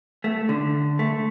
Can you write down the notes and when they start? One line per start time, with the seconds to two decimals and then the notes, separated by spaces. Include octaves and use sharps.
0.24 A3
0.49 D3
0.99 A3